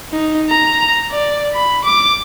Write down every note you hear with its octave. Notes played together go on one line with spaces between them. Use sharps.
D#4
A#5
D5
B5
D6